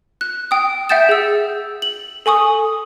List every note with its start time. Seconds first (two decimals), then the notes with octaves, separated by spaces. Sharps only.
0.21 F#6
0.51 G5 D#6
0.89 E5 F#5 G5 G6 A6 E7
1.09 G#4 E6
1.82 F#7
2.26 A4 G#5 C#6 D#6